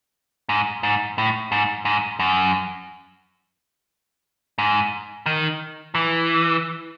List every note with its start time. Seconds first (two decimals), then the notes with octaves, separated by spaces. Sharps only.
0.49 G#2
0.83 G#2
1.18 A2
1.52 G#2
1.85 G#2
2.19 F#2
4.58 G#2
5.26 D#3
5.95 E3